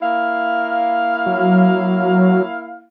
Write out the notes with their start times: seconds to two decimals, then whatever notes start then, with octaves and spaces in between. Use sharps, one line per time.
0.02 A#3 E4 F5
1.26 F#3